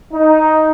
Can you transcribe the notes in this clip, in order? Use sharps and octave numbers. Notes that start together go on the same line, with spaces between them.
D#4